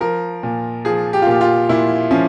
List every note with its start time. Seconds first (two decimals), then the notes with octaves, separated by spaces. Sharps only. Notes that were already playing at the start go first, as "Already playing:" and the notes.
0.01 F3 A#4
0.43 A#2
0.85 F3 G#4
1.13 G4
1.22 F4
1.27 A#2 G4
1.41 F4
1.69 A#2 E4
2.11 F3 C#4